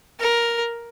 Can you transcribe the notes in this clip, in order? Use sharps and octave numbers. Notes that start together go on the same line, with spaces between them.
A#4